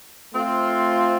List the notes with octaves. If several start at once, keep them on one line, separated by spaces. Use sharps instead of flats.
A3 C4 F4